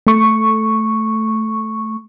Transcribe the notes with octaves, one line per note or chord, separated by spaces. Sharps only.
A3 C#6